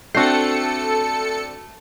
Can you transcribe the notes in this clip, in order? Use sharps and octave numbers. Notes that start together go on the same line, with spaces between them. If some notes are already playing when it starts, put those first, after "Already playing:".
A3 C4 D4 F#4 A4 G5 C7 C#7